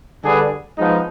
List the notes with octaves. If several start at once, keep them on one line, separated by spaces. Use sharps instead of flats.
D3 G3 D4 G#4 B4
F3 G#3 B3 D#4